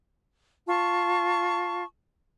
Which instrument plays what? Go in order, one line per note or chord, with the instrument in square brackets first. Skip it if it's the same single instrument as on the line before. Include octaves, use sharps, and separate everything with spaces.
[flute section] F4 A5 C#6